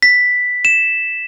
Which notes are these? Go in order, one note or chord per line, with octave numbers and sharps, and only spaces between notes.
B6
E7